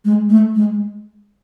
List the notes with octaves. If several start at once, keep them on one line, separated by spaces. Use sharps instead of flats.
G#3
A3
G#3